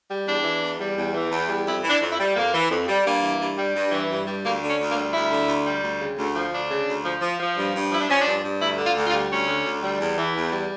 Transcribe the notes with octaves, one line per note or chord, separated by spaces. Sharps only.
G3
E2 D4
E3
E2
G3
E2
E3
E2
G3
F2 E4
E3
D4
F2
E4
G3
F2 A#3
E3
F2
G3
G2 A#3
E3
G2
G3
G2
E3
G2
G3
D2 A#3
D3
C#4
D2
A#3
G3
D2 E4
D3
D2
G3
D2
C#3
D2
F3
D2 D4
C#3
D2
F3
F3
F3
G2
G2
F3 E4
D4
F3 C#4
G2 D4
G2
D2 E4
D3
F4
D2
F4
G3
D2 C#4
D3
D2
G3
E2
E3
E2
G3